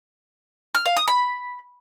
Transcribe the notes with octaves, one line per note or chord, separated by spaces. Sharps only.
F6
F5
D#6
B5